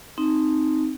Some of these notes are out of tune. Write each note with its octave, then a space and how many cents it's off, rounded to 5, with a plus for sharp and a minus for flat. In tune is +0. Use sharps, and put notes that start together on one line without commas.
C4 +0 D#4 +0